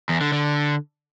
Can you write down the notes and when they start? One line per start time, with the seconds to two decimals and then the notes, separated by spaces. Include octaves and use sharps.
0.09 E2
0.21 D3
0.33 D3